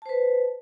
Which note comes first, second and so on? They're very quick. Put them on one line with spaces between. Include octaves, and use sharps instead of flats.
A5 C5 B4